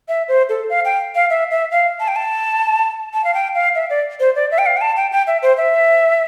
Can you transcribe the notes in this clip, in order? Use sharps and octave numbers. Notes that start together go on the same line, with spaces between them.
E5
C5
A4
F5
G5
F5
E5
E5
F5
A5
G5
A5
A5
F5
G5
F5
E5
D5
C5
D5
E5
G5
F5
G5
A5
G5
G5
E5
C5
E5